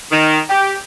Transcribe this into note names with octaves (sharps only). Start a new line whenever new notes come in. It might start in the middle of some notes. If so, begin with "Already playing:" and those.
D#3
G4